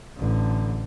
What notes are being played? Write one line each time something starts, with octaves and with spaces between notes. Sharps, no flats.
A1 D3